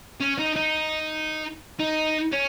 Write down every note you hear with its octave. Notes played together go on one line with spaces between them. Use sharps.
C#4
D#4
D#4
D#4
C#4